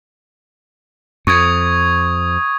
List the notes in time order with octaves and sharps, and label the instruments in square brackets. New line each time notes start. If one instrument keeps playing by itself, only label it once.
[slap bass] F2 [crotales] C#6 D#6 G#6